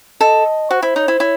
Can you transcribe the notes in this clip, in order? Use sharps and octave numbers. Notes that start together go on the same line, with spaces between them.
A4 D#5
F#4 C5
E4 C5
D#4 C#5
E4 C5
E4 C#5